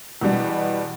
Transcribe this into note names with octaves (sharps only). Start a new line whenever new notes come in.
E2 B2 G3